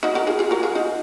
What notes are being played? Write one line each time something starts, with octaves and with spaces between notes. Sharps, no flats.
D#4 F#4
F#4 A#4
F4 G#4
F4 G#4
F#4 A#4
F4 G#4
D#4 F#4